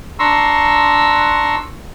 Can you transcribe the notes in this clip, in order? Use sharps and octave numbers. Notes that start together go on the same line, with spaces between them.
D4 A#5 C6 C#6 E6